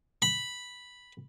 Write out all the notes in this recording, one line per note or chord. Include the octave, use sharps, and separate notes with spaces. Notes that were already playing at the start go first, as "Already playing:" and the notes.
B5